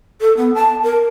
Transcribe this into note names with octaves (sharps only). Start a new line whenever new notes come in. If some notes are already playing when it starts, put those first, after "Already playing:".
A4
B3
A5
A#4